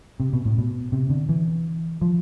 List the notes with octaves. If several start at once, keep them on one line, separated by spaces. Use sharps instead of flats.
C3
B2
A2
B2
C3
D3
E3
F3